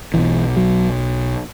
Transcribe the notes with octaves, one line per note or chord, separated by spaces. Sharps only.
B1 B2 E3
F#3